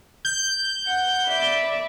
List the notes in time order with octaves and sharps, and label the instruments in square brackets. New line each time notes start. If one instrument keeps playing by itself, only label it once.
[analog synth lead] G6
[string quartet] F#5
D5 E5 B5